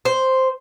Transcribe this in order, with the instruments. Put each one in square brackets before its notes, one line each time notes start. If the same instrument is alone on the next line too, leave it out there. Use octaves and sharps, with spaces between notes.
[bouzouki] C5